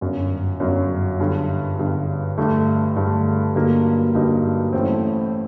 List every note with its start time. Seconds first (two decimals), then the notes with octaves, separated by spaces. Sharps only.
0.01 G1 F#2 F#3
0.60 G1 F#2 F#3
1.19 G1 G2 D3
1.78 G1 G2 D3
2.38 G2 D3 A3
2.96 G2 D3 A3
3.55 G2 D3 F#3 A#3 D#4
4.14 G2 D3 F#3 A#3 D#4
4.73 A1 A2 A3 C4